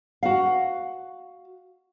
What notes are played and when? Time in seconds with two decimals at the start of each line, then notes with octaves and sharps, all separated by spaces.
0.23 F#4 F5